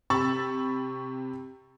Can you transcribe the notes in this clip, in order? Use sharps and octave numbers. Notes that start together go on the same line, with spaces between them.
C3 B5 C#6 E6 A6